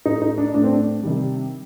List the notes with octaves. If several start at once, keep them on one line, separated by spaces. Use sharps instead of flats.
A2 A3 D#4
D#4
D4
A2 A3 D4
C4
D4
C3 D#3 G3